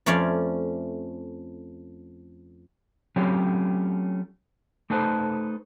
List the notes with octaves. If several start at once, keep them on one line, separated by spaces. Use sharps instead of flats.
F2 A3 C#4 D5 F5
F#3 A3 C4 C#4 F4 G4
A3 D#4 A4 B4 C5